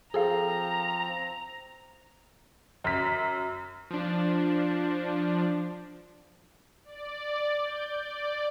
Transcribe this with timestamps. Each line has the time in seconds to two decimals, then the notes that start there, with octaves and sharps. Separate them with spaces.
0.14 F3 C4 G#4 A4 F5 A#5
2.84 F#2 B6
3.91 F3 D4
6.84 D5
7.64 G6
7.96 D5